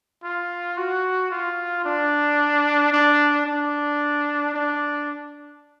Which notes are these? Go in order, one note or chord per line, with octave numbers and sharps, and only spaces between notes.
F4
F#4
F4
D4
D4
D4
D4